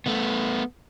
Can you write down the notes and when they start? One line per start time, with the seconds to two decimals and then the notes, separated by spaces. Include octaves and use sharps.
0.06 A3 B3